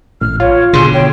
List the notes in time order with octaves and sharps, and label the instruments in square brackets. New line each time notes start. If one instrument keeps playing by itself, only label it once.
[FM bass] A1 [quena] F6
[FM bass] F4 [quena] C#5
[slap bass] B2 D3 [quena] G#4 [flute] C6
[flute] C#5 [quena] G5